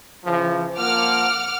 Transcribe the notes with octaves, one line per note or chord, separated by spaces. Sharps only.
C#3 E3 F3
F3 A#3 F#5 D6 F6